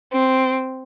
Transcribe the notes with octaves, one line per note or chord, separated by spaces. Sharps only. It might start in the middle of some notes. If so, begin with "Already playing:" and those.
C4